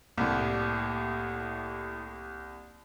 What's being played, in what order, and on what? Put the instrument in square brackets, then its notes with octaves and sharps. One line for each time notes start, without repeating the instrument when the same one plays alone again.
[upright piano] C2 [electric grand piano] A2 G4 D6 [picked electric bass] A#3